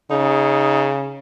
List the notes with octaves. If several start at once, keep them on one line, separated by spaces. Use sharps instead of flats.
C#3 D#4